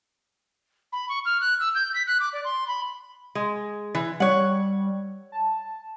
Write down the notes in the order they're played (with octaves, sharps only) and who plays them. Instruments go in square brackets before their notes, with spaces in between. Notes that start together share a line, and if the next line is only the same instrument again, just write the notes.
[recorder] B5
C#6
F6
F#6
E6
G6
B6
F#6
D6
D5
C6
B5
[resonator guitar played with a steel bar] G#3
E3
[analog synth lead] G3 [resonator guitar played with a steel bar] C#5 F#5
[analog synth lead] A5